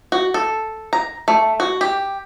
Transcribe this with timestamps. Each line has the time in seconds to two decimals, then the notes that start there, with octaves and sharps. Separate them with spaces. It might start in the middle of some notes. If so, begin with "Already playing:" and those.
0.12 F#4
0.34 A4
0.93 A#5
1.28 A3
1.60 F#4
1.81 G4